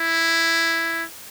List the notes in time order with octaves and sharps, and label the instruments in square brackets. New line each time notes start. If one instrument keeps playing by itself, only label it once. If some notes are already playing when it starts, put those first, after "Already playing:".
Already playing: [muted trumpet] E4